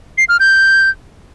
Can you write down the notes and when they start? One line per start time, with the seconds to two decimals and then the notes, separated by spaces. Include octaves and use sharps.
0.18 C7
0.29 F6
0.40 G6